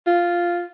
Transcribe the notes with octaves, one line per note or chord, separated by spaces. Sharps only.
F4